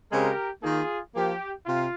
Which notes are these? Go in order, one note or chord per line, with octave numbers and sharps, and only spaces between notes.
C#3 G#3 C4 G4 A#4
D#3 A#3 D#4 F4 G#4
F3 A#3 F4 G4
C3 F4